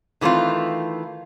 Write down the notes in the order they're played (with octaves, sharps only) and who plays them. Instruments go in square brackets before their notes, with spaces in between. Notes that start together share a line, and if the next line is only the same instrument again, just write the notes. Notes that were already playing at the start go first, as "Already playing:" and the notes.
[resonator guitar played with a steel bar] D#3 E3 A3 C4 F4